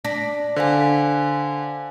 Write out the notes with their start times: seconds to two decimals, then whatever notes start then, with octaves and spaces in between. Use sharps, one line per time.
0.05 D4 A#6 B6
0.56 D3 C5 F5 G#5